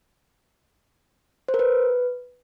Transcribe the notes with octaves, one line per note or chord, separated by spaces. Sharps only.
C5
A#4
B4